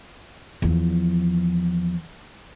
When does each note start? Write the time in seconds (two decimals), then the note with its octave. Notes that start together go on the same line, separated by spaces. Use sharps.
0.62 E2 F3